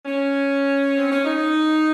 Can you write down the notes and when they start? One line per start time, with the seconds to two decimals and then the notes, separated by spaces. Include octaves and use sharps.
0.06 C#4
0.97 C4
1.12 C#4
1.25 D#4